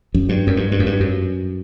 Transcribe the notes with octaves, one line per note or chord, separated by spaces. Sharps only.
F#2
G2
F#2
G2
G2
F#2
G2
F#2